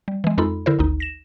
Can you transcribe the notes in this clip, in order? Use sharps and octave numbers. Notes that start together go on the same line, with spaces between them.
G3
E3 G#3
F2 G#3 D#4 F4 A4 B5
D3 E4 A#4 C5
G#1 D2 D#4
A#6 E7